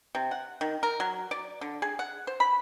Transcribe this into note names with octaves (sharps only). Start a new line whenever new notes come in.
C3
F#5
D#3
A#4
F#3
D5
D3
G#4
F#5
C5
B5